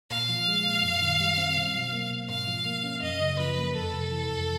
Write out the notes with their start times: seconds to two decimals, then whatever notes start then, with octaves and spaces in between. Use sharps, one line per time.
0.10 A#2 F5
0.29 F3
0.48 G#3
0.66 A#2
0.83 F#2
1.02 D#3
1.20 G3
1.38 C4
1.56 B2
1.74 F#3
1.92 A#3
2.11 B2
2.29 G#2 F5
2.47 F3
2.65 A#3
2.84 C#4
3.02 F#2 D#5
3.20 C#3
3.39 F3 B4
3.57 A#3
3.75 F2 A4
3.93 C3
4.11 E3
4.30 F2